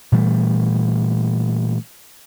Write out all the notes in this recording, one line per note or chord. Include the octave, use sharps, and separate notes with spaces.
A#2 E3 G3 A3